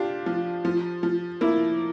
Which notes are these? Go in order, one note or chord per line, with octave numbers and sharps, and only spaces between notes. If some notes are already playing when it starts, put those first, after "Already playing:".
Already playing: D4 F4 G4
F3
F3
F3
A#3 E4